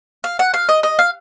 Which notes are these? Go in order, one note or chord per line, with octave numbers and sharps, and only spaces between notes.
F5
F#5
F5
D#5
D#5
F5